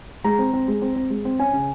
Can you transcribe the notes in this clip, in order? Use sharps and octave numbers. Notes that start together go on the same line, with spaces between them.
G#3 A#5
C4
C4
G#3
C4
C4
G#3
C4
C#4 G#5
C#3